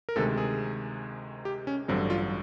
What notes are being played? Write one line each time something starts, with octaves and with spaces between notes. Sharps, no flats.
A#4
D2 C3 D#3 G#3 A4
G#4
G4
C#4
A1 G2 D3 F#3 C4
F4